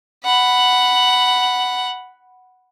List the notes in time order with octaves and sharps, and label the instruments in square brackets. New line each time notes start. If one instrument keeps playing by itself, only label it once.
[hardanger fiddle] F#5 B5